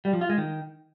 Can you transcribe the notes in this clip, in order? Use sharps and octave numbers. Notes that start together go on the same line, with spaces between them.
G3
F3
F4
G#3
D#3